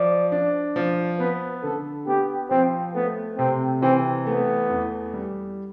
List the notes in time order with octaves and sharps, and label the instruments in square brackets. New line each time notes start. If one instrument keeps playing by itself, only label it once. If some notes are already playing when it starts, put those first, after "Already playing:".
Already playing: [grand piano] F3 [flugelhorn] D5
[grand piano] D4
F3
[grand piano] B3 [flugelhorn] B4
[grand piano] D3 [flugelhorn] A4
[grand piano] B3 [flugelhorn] G4
[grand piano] F3 [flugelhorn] C4
[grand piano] A3 [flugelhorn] B3
[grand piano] C3 [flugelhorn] C4
[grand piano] E3 [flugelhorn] C4
[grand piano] A3 [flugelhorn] B3
[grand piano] E2
G3